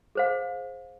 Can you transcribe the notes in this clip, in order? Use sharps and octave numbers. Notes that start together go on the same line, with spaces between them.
G#4 C5 F5